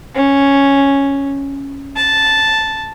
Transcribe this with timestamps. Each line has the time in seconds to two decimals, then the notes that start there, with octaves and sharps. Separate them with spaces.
0.15 C#4
1.96 A5